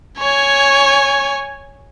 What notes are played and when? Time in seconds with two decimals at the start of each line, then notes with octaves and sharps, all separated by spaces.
0.19 C#5 G#5